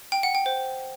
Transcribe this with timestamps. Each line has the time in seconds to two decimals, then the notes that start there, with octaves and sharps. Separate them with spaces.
0.12 G5
0.23 F#5
0.35 G5
0.46 C5